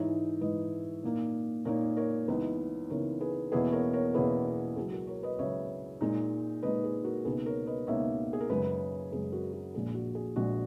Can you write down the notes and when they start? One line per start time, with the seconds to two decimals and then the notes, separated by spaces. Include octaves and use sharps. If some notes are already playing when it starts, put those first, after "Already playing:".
Already playing: G#2 E3 G#3 D#4 C#5 E5
0.41 G#2 E3 G#3 D#4 B4 D#5
1.03 A#2 A#3 D#4
1.65 A#2 A#3 D#4 A#4 C#5
1.97 A#4 C#5
2.28 C#2 C#3 E3 B3 D#4 B4 D#5
2.90 C#2 C#3 E3 B3 D#4 A#4 C#5
3.21 G#4 B4
3.52 E2 B2 A#3 C#4 E4 G#4 B4
3.72 A#4 C#5
3.93 A#4 C#5
4.14 E2 B2 A#3 C#4 E4 G#4 B4
4.77 C#2 C#3 F#3 G#4
4.92 F#4 A#4
5.07 A#4 C#5
5.23 B4 D#5
5.39 C#2 C#3 F#3 C#5 E5
6.01 A#2 G#3 D#4
6.63 A#2 G#3 D#4 B4 D#5
6.84 G#4
7.04 F#4 A#4
7.25 C#2 B2 A#3 D#4 G#4 B4
7.46 A#4 C#5
7.66 B4 D#5
7.87 C#2 B2 A#3 D#4 C#5 E5
8.33 G#4
8.41 A#4
8.50 F#2 C#3 G#3 G#4 B4
9.12 F#2 C#3 G#3 G#4
9.32 F#4 A#4
9.53 F#4
9.74 A#1 A#2 G#3 G#4
9.94 F#4
10.15 G#4
10.36 A#1 A#2 G#3 F#4